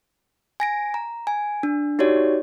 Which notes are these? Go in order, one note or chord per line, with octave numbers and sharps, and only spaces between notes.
G#5 A#6 D7
A#5
G#5
D4
D#4 F#4 G4 C#5 D5